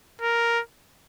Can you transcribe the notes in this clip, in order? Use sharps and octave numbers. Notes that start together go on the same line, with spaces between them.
A#4